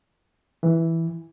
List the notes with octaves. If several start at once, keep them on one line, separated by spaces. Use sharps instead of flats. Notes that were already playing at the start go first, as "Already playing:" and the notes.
E3